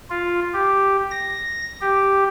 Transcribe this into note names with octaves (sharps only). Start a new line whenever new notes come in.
F4
G4
A#6
G4